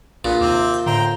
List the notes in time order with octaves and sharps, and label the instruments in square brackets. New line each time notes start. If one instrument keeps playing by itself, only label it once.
[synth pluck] A#1 [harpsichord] A#2 [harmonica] B3
[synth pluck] D#2 C3 [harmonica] C4 D6
[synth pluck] G6
[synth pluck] A2 D3 [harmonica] C5 G5 A#5